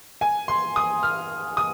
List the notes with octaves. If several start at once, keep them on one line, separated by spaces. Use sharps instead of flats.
G#5
C6
D#6
F6
D#6